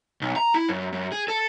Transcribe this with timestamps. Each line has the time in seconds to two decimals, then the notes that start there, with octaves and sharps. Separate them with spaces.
0.21 B1
0.36 A#5
0.54 E4
0.69 F#2
0.92 F#2
1.12 G#4
1.28 A4